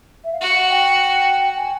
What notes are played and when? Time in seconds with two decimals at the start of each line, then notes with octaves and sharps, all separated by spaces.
0.24 E5
0.33 F5
0.40 F#4 F#5
0.70 G5
1.57 G#5